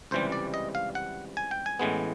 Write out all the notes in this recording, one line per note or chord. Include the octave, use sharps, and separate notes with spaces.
C#2 C3 E3 G3 C5
D5
D#5
F5
F#5
G#5
G5
G#5
A1 A2 E3 G#3 B3